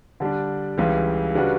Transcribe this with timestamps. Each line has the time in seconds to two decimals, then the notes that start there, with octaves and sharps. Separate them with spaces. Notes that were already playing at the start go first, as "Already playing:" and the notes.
0.20 D3 G3 D4
0.78 C#2 C#3 E3 G3
1.35 C#3 G3 D4 F#4 B4